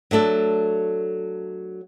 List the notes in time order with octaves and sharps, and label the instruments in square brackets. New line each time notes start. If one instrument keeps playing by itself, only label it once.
[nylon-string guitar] F#3 A3 D4 A4